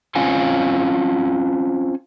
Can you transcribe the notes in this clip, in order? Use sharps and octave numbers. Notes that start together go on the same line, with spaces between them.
C4 C#4 F4 F5 G#5